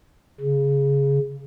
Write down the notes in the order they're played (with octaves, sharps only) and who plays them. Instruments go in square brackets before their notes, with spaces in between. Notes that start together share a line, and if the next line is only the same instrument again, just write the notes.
[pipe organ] C#3